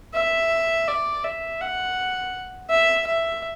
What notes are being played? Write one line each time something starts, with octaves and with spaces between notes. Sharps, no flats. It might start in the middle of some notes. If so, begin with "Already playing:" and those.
E5
D5
E5
F#5
E5
E5